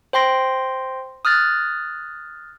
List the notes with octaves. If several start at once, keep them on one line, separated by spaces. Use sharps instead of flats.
C5 G5 C6 A#6
D#6 F6 F#6 A6